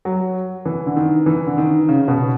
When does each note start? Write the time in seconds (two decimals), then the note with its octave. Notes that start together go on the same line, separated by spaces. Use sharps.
0.05 F#3
0.66 E3
0.86 D3
0.96 D#3
1.26 E3
1.47 D3
1.58 D#3
1.89 C#3
2.08 B2